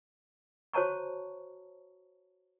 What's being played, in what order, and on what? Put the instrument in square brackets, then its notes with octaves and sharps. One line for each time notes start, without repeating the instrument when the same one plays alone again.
[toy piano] F#4 C5 C#5 A5 A#5 C#6